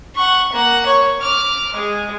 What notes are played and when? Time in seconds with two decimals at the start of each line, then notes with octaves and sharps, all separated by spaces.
0.15 F#5 C#6
0.53 A#3 F#5
0.86 C#5
1.21 D6 F6
1.73 G#3 G#4